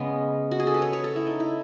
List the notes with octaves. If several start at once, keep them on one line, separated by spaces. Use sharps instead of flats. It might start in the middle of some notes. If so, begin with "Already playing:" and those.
Already playing: C#3 G#3 B3
F#4
G#4
A4
B4
C#5
C#5
A4
E4
D#4
E4